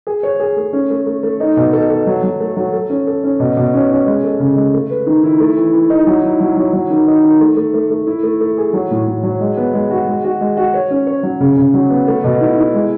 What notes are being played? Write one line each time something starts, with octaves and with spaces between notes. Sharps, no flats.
G#4
C#5
G#4
A3
C#4
A3
A3
A3
D#4
B2
A4
A4
F#3
F#3
A3
F#3
A4
C#4
A4
C#4
B2
B2
C#4
C#4
G#3
A4
C#3
G#3
A3
B4
D#3
E4
A3
E3
E3
D#4
F#3
E4
F#3
F#3
F#3
D#3
D#4
D#3
A3
A3
A3
A3
E4
A3
A3
G#4
F#3
A2
A2
F#3
G#3
B3
G#3
F#4
G#3
F#4
G#3
F#4
C#5
C#4
C#5
F#3
C#3
C#3
F#3
B3
A3
B2
E4
E4
G#3